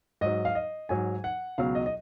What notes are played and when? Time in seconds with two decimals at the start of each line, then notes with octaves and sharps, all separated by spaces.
0.21 G#2 F#3 D#5
0.45 F5
0.55 D#5
0.89 G#2 F#3 G#5
1.24 F#5
1.58 C#2 B2 F#3 F5
1.75 D#5
1.86 D#5